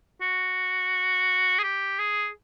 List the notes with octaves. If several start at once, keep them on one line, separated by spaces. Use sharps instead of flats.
F#4
G#4
G4
G#4